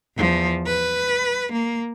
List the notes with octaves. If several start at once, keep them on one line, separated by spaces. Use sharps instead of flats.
E2 F3
B4
A#3